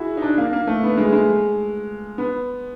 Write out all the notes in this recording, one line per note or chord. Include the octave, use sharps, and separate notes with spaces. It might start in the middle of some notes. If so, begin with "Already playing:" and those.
Already playing: E4 F#4 G#4
D#4
D4
A#3
A#3
A3
B3
G#3
G#3
B3